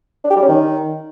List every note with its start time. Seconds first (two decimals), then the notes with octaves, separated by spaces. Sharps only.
0.24 D4
0.30 G4
0.36 G3
0.42 C#4
0.49 D#3